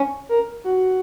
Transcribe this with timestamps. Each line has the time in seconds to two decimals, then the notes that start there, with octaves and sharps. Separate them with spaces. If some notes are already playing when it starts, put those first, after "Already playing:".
Already playing: C#4
0.29 A#4
0.64 F#4